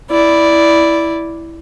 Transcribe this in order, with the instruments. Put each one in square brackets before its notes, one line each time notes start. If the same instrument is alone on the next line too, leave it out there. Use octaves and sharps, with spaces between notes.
[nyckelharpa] E4 D5